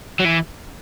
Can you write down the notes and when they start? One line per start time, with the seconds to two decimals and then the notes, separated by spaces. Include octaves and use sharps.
0.20 F#3
0.25 E3